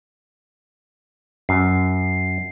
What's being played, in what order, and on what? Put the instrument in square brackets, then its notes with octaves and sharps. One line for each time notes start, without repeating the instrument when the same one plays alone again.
[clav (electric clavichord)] F#2 [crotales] C7